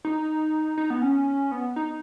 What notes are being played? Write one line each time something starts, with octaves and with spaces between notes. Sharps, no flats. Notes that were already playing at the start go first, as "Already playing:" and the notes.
D#4
D#4
B3
C#4
B3
D#4